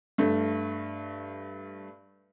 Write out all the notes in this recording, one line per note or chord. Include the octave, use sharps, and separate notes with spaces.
G2 A3